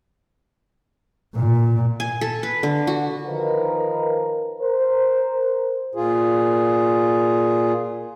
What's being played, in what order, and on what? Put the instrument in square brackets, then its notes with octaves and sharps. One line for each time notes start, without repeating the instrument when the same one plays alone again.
[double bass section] A#2
[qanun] G#5
A4
B4
D3
F#4
[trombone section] D#3 F3 D#4 A#4 B4
A#4 C5
[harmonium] A#2 F4 G#4